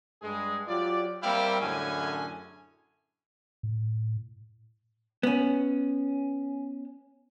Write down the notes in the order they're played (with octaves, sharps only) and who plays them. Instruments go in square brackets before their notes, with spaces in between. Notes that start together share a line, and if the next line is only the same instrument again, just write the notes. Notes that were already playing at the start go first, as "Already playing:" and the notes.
[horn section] G2 G#3 G#4
F#3 F4 G4 D5
G3 A#3 C4 E4 F5 G5
F#2 A2 D3 C#4 G#4 G#5
[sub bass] A2
[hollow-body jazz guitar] B3 C#4